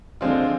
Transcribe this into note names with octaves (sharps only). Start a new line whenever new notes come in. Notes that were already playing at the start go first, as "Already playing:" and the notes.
D3 F3 G#3 C4 F4